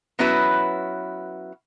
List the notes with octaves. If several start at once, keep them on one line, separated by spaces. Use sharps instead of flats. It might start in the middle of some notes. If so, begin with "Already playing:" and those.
F#3 B3 C#4 E4 F#4 B4